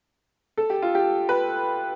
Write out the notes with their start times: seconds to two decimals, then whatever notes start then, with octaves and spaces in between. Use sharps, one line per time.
0.58 A4
0.70 G4
0.82 F4
0.95 G4
1.29 B4